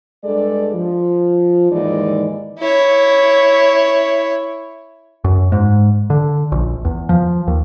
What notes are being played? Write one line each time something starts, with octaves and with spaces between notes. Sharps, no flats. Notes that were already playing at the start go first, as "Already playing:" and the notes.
G2 G#3 A4 D5
F3
D#2 G#2 E3 G#3 D#4 D5
E4 C#5
F#2
G#2
D3
A#1
E2
F3
D#2